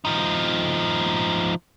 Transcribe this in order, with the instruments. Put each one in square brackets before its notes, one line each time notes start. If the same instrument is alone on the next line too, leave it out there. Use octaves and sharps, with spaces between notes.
[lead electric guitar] F3 D#4